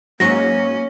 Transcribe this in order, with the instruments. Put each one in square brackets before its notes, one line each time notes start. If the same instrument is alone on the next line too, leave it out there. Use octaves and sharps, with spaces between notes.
[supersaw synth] G#2 F#3 [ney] A#3 [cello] C#4 [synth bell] C#6 A#6